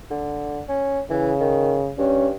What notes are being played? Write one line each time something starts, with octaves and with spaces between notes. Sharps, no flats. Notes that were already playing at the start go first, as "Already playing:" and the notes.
D3
C#4
C#3 E3
D#3
G2 C#4